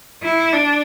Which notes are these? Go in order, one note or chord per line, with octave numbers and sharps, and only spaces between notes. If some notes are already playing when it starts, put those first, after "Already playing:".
E4
D4